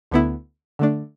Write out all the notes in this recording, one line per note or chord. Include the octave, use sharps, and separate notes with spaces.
D2 D3 B3 E4
D3 A3 D4